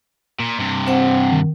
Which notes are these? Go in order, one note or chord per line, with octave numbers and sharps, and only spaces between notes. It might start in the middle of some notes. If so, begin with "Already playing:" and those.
A#2
G2 C3
C4 C5 F#5 G5
D#3